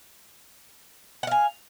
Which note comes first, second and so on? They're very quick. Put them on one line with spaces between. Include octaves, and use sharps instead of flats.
F#5 F5 G#5